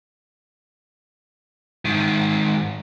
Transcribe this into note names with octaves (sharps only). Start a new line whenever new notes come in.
G#2 D#3